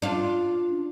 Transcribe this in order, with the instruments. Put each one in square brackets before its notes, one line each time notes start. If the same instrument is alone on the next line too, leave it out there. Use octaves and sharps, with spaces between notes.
[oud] D4 F4